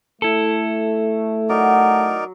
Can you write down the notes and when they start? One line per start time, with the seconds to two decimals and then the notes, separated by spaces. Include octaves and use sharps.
0.22 A3 E4 A4
1.49 F#3 D#4 A#4 D5